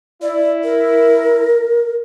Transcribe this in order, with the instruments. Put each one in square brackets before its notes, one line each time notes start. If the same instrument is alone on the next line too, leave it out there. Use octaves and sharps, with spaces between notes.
[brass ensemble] E4 [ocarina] D5
[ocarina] A#4